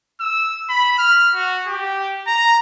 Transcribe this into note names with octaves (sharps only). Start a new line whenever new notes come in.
E6
B5
F6
F#4
G4
A#5